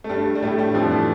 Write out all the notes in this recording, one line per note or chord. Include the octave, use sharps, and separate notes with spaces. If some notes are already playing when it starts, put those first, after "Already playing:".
A3
G2 G3
G3
A2 A3
G2 G3
F2 F3
E3